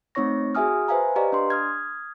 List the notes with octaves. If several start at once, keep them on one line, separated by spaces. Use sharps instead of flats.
A3 C4 D#4 C#5 C#6 A#6
F#4 G#4 E5 G#5 D#6 F6
B4 C5 E5 F5 G#5 A#5
G4 B4 D5 D#5 F5 A#5
D4 C6
D#6 F6 G#6